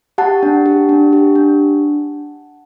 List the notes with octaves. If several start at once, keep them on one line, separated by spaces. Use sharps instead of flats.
G4 F#5 A5
D4
G4
D4
G4
D4